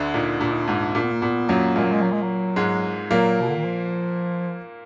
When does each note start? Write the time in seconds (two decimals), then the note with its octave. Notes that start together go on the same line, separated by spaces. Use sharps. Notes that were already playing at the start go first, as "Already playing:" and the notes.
Already playing: D2 D3
0.14 A#2 D#4
0.41 A#2 D4
0.51 D#4
0.63 G#2 D4
0.94 A#2 D4
1.03 B3
1.12 A#3
1.21 A#2 B3
1.48 F#2 F#3 A#3
1.76 A#2 G#3 A#3
1.84 F#3
1.92 G#3
2.02 F#3
2.13 G#3
2.22 F#3
2.56 G#2 G#3
3.10 A#2 F#3 A#3
3.41 B2
3.49 D3
3.57 D#3
3.65 F3